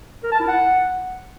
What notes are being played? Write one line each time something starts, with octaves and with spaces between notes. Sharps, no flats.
A#4
A5
E4
F#5